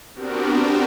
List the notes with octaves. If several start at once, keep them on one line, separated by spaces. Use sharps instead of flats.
B3 C4 D4 F#4 G4 A#4